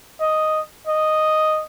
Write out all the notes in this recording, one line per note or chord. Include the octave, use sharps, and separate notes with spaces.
D#5
D#5